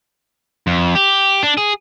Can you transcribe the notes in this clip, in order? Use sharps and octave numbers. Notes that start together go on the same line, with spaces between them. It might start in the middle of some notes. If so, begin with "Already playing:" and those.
F2
G4
D4
G#4